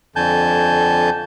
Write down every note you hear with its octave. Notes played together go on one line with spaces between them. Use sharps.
F2 D3 G#5 A5 G6